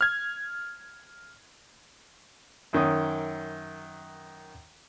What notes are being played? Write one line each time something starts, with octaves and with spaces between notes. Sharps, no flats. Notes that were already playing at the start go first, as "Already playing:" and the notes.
F6 G#6
F#2 D#3 C#4 D#6